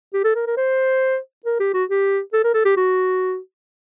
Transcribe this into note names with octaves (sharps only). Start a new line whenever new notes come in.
G4
A4
A#4
A#4
C5
A#4
G4
F#4
G4
A4
A#4
A4
G4
F#4